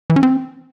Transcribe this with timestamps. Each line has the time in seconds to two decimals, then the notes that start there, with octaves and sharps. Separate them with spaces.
0.10 E3
0.16 C#4
0.23 C4